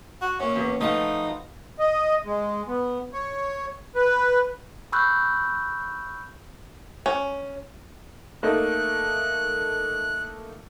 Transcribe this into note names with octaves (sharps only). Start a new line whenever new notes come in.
F#4
F#2 A#2 C#4
E2
F3 A3 D#4 B4 D#5 F#5
D#5
G#3
B3
C#5
B4
B5 C#6 E6 F#6 G6
C#4
A3 A#3 D#4 F#6